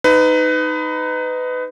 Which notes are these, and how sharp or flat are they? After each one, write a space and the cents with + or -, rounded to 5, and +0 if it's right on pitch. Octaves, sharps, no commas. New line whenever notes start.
D#4 +0 B4 +25